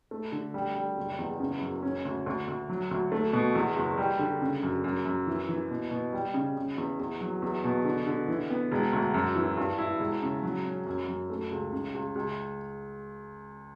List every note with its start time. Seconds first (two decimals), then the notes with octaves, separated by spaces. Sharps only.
0.11 A3
0.32 D3
0.54 G3
0.75 G3
0.97 F#1
1.19 E2
1.40 C#3
1.61 F#2
1.82 C#4
2.05 D2
2.26 D2
2.48 D2
2.70 F#3
2.91 D2
3.12 A3
3.33 B2
3.55 E2
3.76 F#1
3.98 G3
4.19 D3
4.42 C#3
4.63 F#2
4.84 F#2
5.05 F#2
5.27 E3
5.49 E3
5.70 B2
5.91 B2
6.13 G3
6.34 C#3
6.57 C#3
6.78 E2
7.00 E2
7.21 F#3
7.42 E2
7.64 B2
7.85 D3
8.06 D3
8.28 E3
8.50 B3
8.71 E1
8.93 D2
9.14 F#2
9.36 E3
9.57 G2
9.79 E4
10.00 E1
10.22 C#3
10.43 F#3
10.65 C#4
10.86 F#2
11.08 F#2
11.30 A3
11.51 C#2
11.72 C#3
11.94 C#2
12.15 C#2